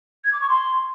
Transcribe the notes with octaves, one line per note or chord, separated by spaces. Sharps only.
G#6
D6
C#6
C6